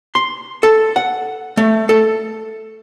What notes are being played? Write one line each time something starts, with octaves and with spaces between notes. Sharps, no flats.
C6
A4
F#5
A3
A4